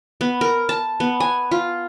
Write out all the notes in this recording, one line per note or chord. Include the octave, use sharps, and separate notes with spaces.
B3
A#4
A5
B3
G#5
F4